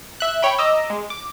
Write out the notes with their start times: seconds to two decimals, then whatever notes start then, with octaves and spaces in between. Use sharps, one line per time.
0.20 E5 F#6
0.42 C#5 G5 B5
0.59 D#5 A#5 D6 E6
0.90 G#3
1.10 D6